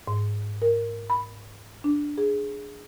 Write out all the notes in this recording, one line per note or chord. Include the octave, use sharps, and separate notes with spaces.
G#2
A#4
B5
D4
G#4